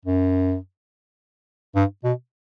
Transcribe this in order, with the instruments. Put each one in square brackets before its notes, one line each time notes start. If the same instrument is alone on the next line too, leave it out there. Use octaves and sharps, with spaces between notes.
[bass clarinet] F#2
G2
B2